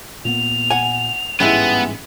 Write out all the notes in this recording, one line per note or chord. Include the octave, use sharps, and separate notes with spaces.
A#2 A#3 B3 F7
F#5 G#5
A1 G#2 G3 G#3 B3 C#4 E4 E5